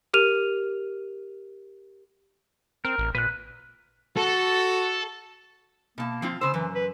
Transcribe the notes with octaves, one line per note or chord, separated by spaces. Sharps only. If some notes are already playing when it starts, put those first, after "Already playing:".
G4 A#4 F6 D#7 F7
C4 A#4
A1
A#2 B4 F#6
F#4 A4
B2 A#3 A5
F3 C4 F4
C#3 C5 E6
F#2 E3
B4